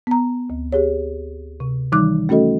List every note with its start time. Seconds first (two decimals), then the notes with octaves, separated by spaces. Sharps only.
0.07 B3 A#5
0.50 D2
0.72 G4 G#4 C#5
1.60 C3
1.92 D#3 E3 G3 D#4 D6 F#6
2.29 A3 C#4 F#4 A4 D#5